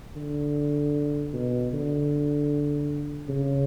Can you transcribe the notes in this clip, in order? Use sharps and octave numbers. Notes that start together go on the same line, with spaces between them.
D3
B2
D3
C#3